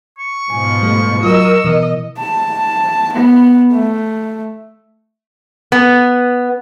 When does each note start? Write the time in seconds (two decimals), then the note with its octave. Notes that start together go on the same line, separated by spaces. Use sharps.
0.19 C#6
0.50 G#2 B2 F3 G#5
0.83 G3 A3
1.23 F#3 F4 A#4 D#5 E6
1.64 B2 E3 D#5
2.18 A5
3.13 B3
3.72 A3
5.72 B3